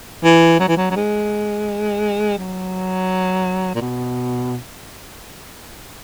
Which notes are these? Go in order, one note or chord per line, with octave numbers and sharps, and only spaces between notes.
E3
F#3
E3
F#3
F#3
G#3
F#3
A#2
B2